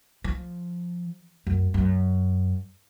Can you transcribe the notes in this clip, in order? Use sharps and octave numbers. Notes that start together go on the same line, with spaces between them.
F3
F#2
F#2